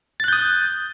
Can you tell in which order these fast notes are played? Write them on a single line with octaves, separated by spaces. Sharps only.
A6 F#6 G6 D#6